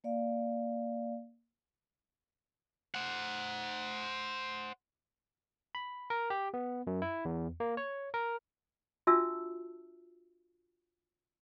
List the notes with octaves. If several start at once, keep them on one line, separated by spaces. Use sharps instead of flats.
A#3 D5 F5
C5 F#5
B5
A#4
G4
B3
F#2
E4
E2
A#3
C#5
A#4
D4 F4 F#4 E5 A5 E6